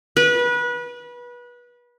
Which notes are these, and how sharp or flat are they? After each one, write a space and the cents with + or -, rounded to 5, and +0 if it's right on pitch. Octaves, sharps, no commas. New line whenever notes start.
B4 -25